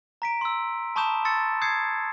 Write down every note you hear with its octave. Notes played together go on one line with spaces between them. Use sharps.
A#5 B6 D7
C6 E6
A5 B5 C#6 D#6 G6 E7
C6 E6 A6 C#7
D#6 G6 G#6 C7 C#7